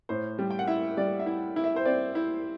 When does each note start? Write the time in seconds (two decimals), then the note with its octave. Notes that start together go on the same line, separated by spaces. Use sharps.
0.09 A2 C5
0.39 G3
0.51 G5
0.59 F#5
0.68 E4 E5
0.97 G3 D5
1.19 E5
1.26 E4
1.56 E4
1.64 E5
1.76 C5
1.85 C4 D5
2.15 E4